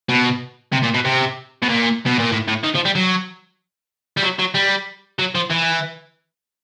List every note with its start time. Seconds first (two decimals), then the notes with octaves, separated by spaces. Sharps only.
0.09 B2
0.72 C3
0.83 A#2
0.94 B2
1.05 C3
1.62 B2
1.69 A#2
2.06 B2
2.19 A#2
2.32 A2
2.48 A2
2.64 D#3
2.75 F3
2.85 G3
2.95 F#3
4.17 G3
4.23 F#3
4.39 F#3
4.54 G3
5.19 F#3
5.35 F3
5.50 E3